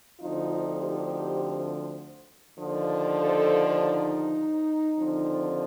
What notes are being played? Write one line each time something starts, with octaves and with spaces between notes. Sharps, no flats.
D2 D3 F3 C4 D#4 F4
D#4 G4
D#2 D3 F3
A4 C5
D#4
D#2 D3 F3 C4